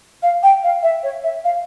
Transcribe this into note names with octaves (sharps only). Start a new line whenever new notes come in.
F5
G5
F5
E5
C#5
E5
F5